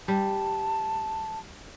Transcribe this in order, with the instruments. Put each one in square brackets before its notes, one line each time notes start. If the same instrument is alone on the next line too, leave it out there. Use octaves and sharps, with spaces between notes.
[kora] G3 [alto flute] A5